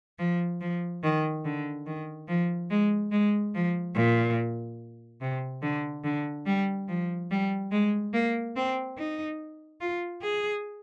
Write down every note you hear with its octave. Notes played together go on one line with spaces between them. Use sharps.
F3
F3
D#3
D3
D#3
F3
G#3
G#3
F3
A#2
C3
D3
D3
G3
F3
G3
G#3
A#3
C4
D#4
F4
G#4